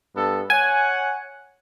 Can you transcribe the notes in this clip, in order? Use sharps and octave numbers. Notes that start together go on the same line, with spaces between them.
G2 B3 A4
C#5 F#5 G#5